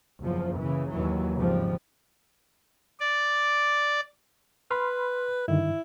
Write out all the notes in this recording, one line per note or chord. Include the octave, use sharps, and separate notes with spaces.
F#1 E2 F3
C#3 E3
D#2 E3 F#3
G#1 C#3 F3 G3
D5
B4 B5 C6 F6
G2 D3 D#3 E4